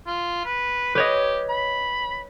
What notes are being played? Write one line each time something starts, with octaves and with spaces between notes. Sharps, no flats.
F4
B4
G4 B4 C#5 D#5
B5